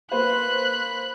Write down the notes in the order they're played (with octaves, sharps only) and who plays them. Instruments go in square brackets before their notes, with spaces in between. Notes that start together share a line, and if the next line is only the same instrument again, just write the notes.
[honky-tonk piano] A#3 B4 C5 [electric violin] B5 F#6